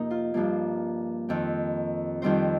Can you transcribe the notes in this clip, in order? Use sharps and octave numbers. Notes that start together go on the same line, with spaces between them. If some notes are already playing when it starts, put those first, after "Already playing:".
Already playing: F2 C3 A#3 D#4
F4
G2 F3 A#3
F2 D#3 C4
F2 D#3 G3 C4 C5